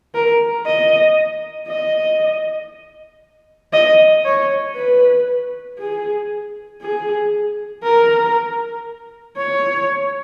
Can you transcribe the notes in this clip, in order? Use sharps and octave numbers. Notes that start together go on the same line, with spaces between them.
A#4
D#5
D#5
D#5
C#5
B4
G#4
G#4
A#4
C#5